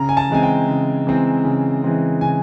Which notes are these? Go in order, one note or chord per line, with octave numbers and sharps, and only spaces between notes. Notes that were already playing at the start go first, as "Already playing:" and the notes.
Already playing: C#3 A#5
G#5
A5
E3 G#3 C4 G#5
G5
C#3
E3 G#3 C4
C#3
E3 G#3 C4
C#3 G#5